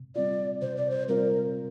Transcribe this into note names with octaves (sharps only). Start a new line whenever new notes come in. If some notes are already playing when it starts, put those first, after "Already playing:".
Already playing: C3
G3 C4 F4 D5
C3 C5
D5
C5
G3 C4 F4 A#4